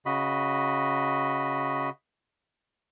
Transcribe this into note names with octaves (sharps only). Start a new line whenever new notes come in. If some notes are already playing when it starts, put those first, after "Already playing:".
C#3 F#4 D#5 B5